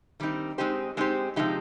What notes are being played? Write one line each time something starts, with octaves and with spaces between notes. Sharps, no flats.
D#3 G3 C4 D#4
G#3 C4 D#4 G4 C5
G#3 C4 D#4 G4 C5
C3 F3 G#3 D#4 G4